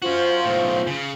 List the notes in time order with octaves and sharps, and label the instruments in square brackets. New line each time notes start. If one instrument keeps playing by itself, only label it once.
[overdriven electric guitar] C#4 F#4 [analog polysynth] F4 C5
[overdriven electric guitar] B1 A2
C#3